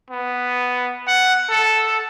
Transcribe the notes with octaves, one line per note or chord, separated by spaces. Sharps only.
B3
F#5
A4